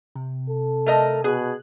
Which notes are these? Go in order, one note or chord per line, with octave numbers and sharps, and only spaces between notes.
C3
A4
A3 A#4 D#5
B2 G#4 F#6